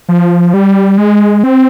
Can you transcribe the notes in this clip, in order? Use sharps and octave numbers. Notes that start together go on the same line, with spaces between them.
F3
G3
G#3
C4